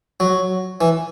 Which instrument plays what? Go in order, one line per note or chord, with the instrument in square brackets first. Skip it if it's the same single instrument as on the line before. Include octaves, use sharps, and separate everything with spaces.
[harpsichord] F#3
E3